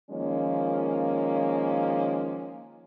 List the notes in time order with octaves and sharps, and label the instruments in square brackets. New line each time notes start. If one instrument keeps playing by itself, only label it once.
[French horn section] D#3 F3 G#3 A#3 C#4